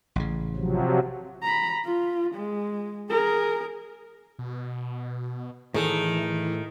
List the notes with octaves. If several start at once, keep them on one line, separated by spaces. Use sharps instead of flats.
A1 C#3
C3 F3 F#3
A#5 B5
F4
G#3
G#4 A#4
B2
A2 D#3 E3 G#4 A4